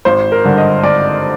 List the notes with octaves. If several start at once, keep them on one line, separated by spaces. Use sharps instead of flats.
G#1 C5
A#4
G2 D3
D#5
G#1 D5